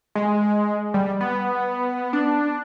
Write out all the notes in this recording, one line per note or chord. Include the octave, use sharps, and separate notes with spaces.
G#3
G3
B3
D4